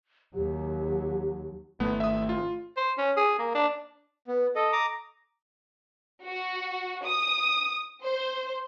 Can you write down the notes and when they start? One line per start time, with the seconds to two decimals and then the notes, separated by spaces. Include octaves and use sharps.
0.35 D#2 F#3 G4
1.80 G#1 A3 B3
2.00 E5 D#6
2.29 F4
2.77 C5
2.98 C#4
3.17 G#4
3.39 A#3
3.55 D4
4.27 B3
4.56 A4 D#5
4.72 A#5 D6 D#6
6.27 F#4
7.06 D#6
8.04 C5